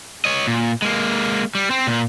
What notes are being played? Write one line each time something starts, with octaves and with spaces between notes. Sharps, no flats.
C#5 D#5
A#2
G#3 A#3
G3
C4
A#2